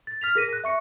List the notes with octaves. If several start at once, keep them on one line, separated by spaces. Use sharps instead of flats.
A6
F6 B6 F7
G#4 A#4 A#6 B6 D#7
F#6 A#6
E5 C#6 C#7